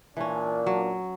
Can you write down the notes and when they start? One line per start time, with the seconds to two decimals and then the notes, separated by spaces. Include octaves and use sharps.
0.17 A#2 E3 C#4 D4
0.66 F#3